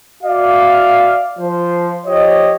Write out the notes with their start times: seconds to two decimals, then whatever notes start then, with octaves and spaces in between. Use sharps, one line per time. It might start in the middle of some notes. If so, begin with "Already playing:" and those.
0.23 F#4 D5 E5 F5
1.39 F3 C5
2.06 F3 G4 C#5 D#5